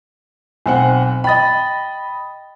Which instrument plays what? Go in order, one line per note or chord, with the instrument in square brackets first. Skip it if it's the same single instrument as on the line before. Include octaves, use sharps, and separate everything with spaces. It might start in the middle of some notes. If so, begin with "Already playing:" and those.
[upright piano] B1 C4 F#5 [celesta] G#5
[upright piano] D#5 B5 [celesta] G5 A6